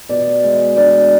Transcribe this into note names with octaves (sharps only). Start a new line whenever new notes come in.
B2 D5
G#3
D4 D5